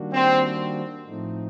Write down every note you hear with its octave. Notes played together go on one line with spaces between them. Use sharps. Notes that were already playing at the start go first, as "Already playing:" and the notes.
Already playing: D#3 G3 A#3 D4 F#4
C4
A2 F3 A3 C4 D#4